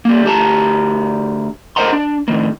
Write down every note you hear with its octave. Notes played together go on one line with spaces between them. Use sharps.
G3 A#3
D2 G4 A5 A#5
A#4 C5 D#5 F#5 A#5 C6
D4
A2 D#3 A#3